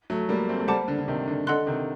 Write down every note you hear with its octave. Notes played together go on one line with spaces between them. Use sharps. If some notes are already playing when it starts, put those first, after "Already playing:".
F#3 A3
G3 A#3
A3 C4
A3
G3 A#3 C5 F#5 A5 D6
D3
D3
C3 D#3
D3
D3 A4 D#5 F#5 C6 F#6
C3 D#3